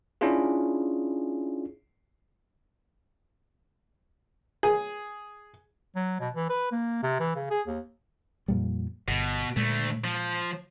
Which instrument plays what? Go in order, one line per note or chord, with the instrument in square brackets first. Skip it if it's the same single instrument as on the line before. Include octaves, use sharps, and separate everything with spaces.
[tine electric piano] C#4 D4 E4 F4 G#4
[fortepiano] G#4
[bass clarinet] F#3
B2
E3
B4
A#3
C3
E3
C#3
G#4
D#2
[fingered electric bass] F2 A#2 G3
[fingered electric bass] G1 [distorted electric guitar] B2
[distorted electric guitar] D2 A3 [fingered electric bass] A#2 G#3
[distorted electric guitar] F3